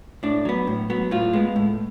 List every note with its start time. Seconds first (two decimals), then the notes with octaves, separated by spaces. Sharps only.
0.23 A2 D4
0.45 F#3 B3
0.67 A2
0.90 F#3 B3
1.11 A2 F4
1.33 G#3 B3
1.56 A2